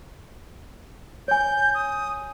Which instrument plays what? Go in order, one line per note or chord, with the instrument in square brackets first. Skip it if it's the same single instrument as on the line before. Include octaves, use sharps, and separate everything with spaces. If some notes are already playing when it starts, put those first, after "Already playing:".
[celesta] C#5 G#5 [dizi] G6
[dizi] D#6